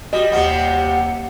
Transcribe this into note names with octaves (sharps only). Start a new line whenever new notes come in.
G3 F#4 D#5
D#2 C3 G3 F#5